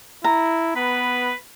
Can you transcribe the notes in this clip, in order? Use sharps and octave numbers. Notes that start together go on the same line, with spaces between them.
E4 A#5
B3 B4